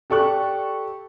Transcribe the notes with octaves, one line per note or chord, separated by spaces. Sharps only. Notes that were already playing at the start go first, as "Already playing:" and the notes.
G4 A4 D5 C#6 F#6